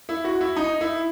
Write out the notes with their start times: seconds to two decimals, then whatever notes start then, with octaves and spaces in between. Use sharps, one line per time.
0.09 E4
0.25 F#4
0.40 E4
0.56 D#4
0.81 E4